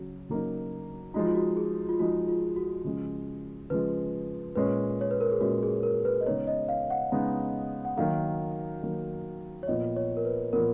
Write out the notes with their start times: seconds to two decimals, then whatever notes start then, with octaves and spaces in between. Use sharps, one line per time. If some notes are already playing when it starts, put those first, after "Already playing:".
Already playing: C#3 F#3 F#4
0.29 C#3 F#3 A#3 D#4
1.14 F3 G#3 D#4 F#4
1.25 F4
1.35 F#4
1.57 G#4
1.89 F4
1.99 F3 G#3 D#4 F#4
2.28 F4
2.56 F#4
2.84 C#3 F3 G#3
3.70 C#3 F3 G#3 B4
4.55 A#2 G#3 C#4 B4
5.01 C#5
5.11 B4
5.20 A#4
5.31 G#4
5.41 A#2 G#3 C#4 F#4
5.63 G#4
5.83 A#4
6.05 B4
6.21 D#5
6.26 C#3 G#3 B3 D#4 C#5
6.47 D#5
6.69 F5
6.90 F#5
7.12 C#3 G#3 B3 D#4
7.85 F#5
7.97 D#3 F#3 A#3 F5
8.82 D#3 F#3 A#3
9.63 C#5
9.68 A#2 F3 B3 D#5
9.96 C#5
10.17 A#4
10.25 B4
10.53 A#2 F3 B3 A#4